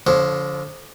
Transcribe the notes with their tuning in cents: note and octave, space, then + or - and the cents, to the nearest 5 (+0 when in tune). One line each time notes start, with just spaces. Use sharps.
D3 -30 F3 +0 C#5 +0